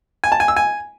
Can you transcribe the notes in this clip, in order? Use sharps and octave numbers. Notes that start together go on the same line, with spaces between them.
G#5
A5
G#5
E6
G#5